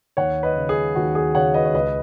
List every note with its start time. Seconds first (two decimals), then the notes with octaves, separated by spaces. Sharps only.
0.17 D#2 C#5 F#5
0.43 B4 D#5
0.56 C#3
0.69 G#4
0.96 D#2 F#4
1.15 G#4
1.34 C#3 C#5 F#5
1.54 B4 D#5
1.65 C#5
1.74 C#2 B4 D#5